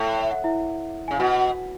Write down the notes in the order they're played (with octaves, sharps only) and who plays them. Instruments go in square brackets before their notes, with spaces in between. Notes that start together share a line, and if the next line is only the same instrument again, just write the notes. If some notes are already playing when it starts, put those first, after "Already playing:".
Already playing: [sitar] A2
[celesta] E5
F#5
E4 E5
[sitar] C#3 [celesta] G#5
[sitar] B2 [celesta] F#4 F#5